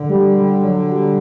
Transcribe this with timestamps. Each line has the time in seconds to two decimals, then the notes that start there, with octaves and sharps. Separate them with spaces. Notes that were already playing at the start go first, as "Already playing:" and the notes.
Already playing: D3
0.09 G3
0.36 G3
0.64 F#3
0.91 G3